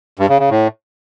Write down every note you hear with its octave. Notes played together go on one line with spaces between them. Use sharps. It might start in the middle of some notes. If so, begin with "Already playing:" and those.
G2
C#3
C#3
A2